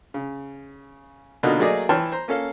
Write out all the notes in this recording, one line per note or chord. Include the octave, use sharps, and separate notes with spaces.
C#3
B2 D3 A#3 D#4 F4 F#4
F#3 A3 A#3 G#4 D5 D#5
E3 C#5 G5 A5 C6 F6
C5 A#5
A#3 C#4 A4 F5